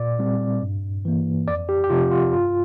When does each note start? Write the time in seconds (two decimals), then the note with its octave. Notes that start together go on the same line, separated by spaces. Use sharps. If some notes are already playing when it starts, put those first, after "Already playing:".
Already playing: A#2 D5
0.19 G3 C4
0.62 G2
1.05 E3 A#3
1.47 F2 D5
1.69 G4
1.84 G4
1.90 C3 F3 C4 F4
2.11 F4
2.33 G2 F4